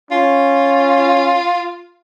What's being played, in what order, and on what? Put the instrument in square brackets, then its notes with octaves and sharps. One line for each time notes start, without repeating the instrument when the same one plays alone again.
[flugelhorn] C#4 [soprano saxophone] F4